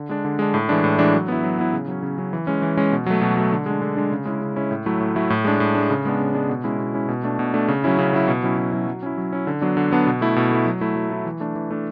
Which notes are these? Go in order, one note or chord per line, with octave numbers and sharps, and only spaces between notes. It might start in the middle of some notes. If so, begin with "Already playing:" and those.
Already playing: D3
G#3 D4
D3
G#3 D4
A2
E3 G#3 D4
A2
E3 G#3 D4
F#3
B3 E4
F#3
B3 E4
C#3
F#3 C#4
C#3
F#3 C#4
E3
G#3 C#4
E3
G#3 C#4
B2
F#3 A3
B2
F#3 A3
D3
G#3 D4
D3
G#3 D4
C#3
G#3 C#4 E4
C#3
G#3 C#4 E4
A2
F#3 A3 E4
A2
F#3 A3 E4
A2
G#3 D4
A2
G#3 D4
C#3
G#3 B3 D4
C#3
G#3 B3 D4
B2
G#3 C#4 E4
B2
G#3 C#4 E4
B2
A3 D4
B2
A3 D4
C#3
F#3 C#4 E4
C#3
F#3 C#4 E4
B2
F#3 C#4 E4
B2
F#3 C#4 E4
F#3
C#4 E4
F#3
C#4 E4
D3
F#3 B3 D4
D3
F#3 B3 D4
B2
A3 E4
B2
A3 E4
F#3
A3 E4
F#3
A3 E4
E3
A3 D4
E3
A3 D4